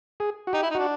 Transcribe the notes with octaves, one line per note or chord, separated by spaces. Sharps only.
G#4
F#4
D#4 G4
E4
D#4
D4 F#4